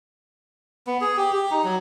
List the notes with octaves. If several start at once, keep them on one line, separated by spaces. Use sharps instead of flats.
B3
G#4
G4
G4
D#4
F#3